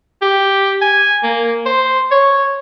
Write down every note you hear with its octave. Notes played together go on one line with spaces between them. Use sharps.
G4
G#5
A#3
C5
C#5